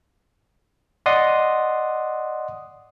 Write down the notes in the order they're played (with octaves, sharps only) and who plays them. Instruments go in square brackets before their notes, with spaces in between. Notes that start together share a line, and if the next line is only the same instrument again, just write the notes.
[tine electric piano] D5 D#5 F#5 C6 D#6